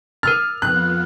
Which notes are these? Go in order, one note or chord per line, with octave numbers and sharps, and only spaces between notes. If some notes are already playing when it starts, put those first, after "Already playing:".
A#4 E6 F6 A6
F2 B3 F4 F#6